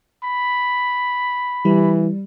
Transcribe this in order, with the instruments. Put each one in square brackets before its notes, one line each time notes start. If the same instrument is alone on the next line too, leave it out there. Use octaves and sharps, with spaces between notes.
[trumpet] B5
[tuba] E3 [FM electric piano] G3